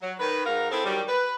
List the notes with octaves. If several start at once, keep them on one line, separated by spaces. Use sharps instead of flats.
F#3
D#3 B4
G#2 D#4 F#4 A#4 F5
C4 E4 G#4 A4 C5
D#3 F#3 G3
B4